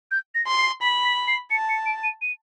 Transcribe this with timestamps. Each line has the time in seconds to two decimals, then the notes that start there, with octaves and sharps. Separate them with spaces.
0.11 G6
0.35 A#6
0.47 C6
0.58 C7
0.82 B5 B6
1.04 B6
1.28 C7
1.51 A5 C#7
1.69 C#7
1.86 D7
2.03 D#7
2.22 D#7